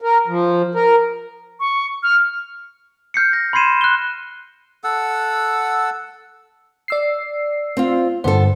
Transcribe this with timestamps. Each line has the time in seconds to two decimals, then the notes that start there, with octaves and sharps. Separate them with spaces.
0.02 A#4
0.27 F3
0.75 A#4
1.60 C#6
2.03 F6
3.14 F6 G6 C7 C#7
3.33 G6 A#6
3.53 B5 C6 G#6 C7 D#7 E7
3.81 F#6 G7
4.84 A4 F#5 E6
6.88 D5 E6 C7
7.77 C4 F4
8.24 G2 D3 B3 A4 C5